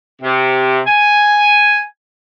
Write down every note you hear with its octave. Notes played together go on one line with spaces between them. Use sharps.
C3
G#5